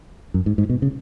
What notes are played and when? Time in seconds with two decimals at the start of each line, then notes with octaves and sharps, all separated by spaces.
0.34 F#2
0.46 G#2
0.58 G#2
0.70 B2
0.82 C#3